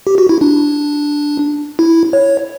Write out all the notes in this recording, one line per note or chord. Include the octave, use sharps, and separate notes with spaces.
G4
F#4
E4
D4
E4
C#5